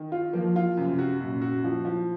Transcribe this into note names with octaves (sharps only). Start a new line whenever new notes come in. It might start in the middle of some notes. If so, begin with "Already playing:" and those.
Already playing: D#3
F4
F3 A#3
F4
F#2 C3
F#4
F#2 A#2
F#4
F3
F3